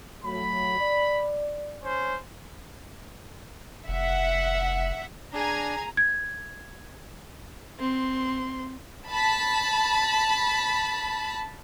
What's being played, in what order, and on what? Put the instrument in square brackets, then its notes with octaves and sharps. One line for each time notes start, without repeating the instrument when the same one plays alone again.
[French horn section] F#3 A3 [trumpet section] B5
[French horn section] D5
[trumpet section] C#4 C5
[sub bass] F1 [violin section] E5 F#5
[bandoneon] D4 [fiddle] G#4 G#5 [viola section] A#5
[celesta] G#6
[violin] C4 C6
[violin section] A5 B5